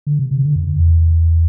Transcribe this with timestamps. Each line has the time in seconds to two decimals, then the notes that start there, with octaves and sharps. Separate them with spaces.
0.07 D3
0.19 C3
0.31 C3
0.44 D3
0.56 F2
0.69 E2